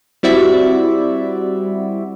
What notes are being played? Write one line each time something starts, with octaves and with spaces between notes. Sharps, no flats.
G3 C4 E4 F#4 D5 E5